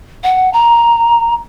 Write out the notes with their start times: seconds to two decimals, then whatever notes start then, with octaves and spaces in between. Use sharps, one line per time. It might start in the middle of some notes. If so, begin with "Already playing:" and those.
0.23 F#5
0.53 A#5